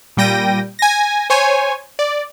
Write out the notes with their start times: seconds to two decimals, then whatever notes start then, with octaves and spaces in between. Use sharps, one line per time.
0.17 A#2 G3 G5 A#6 D#7
0.79 G#5 A#6
1.30 C5 C#5 G#5 G#6
1.99 D5